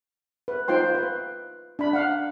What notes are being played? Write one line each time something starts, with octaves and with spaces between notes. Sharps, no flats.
B4
D#4 F4 C5 G5 C6
B4
D4 B5
F5 F#5